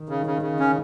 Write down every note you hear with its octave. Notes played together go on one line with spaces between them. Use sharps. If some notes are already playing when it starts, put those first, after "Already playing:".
Already playing: D#3
C#3
C#3
C#3
C#4